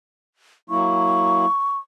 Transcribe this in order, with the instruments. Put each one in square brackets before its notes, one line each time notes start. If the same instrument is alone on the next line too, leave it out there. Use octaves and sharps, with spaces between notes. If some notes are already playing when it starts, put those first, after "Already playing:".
[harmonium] F#3 A#3 E4 [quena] C#6